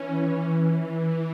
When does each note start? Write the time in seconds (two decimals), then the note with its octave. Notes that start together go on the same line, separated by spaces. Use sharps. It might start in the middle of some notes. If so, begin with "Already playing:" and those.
Already playing: E3 C#4
0.99 E3